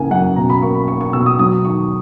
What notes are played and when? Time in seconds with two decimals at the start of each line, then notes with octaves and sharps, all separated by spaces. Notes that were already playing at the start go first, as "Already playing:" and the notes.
Already playing: C#3 E3 A#3 G#5
0.11 F#2 F#5
0.36 B2 A#5
0.50 B5
0.62 A#3 C#6
0.75 B5
0.88 A#3 C#6
1.01 C#6
1.13 B2 E6
1.26 D#6
1.39 F#3 D#6
1.65 D#3 C#6